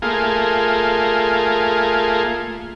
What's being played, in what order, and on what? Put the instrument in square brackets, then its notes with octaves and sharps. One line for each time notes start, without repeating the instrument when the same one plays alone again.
[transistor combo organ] A3 A#3 F4 G#4